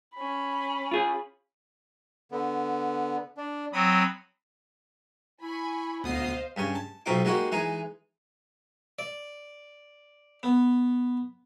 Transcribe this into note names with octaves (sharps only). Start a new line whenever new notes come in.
C#4 B5
F4 G#4
D3 B3
D4
F#3 C4 B5 D#6
E4 G#5 B5 C#6
D2 B3 C5 D#5 F5 D#6 C7
G2 C#3 G#5
A5
B1 B2 C4 D#4 F4 D6
G3 G#3 A#3 D#4 F#4 G4
E3 G#3 D#4 G#4
D5
B3